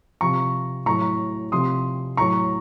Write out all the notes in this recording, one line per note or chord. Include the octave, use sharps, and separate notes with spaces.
C3 F3 A#5 C#6
A2 F#3 A#5 C#6
C3 F3 C6 D#6
A2 F#3 A#5 C#6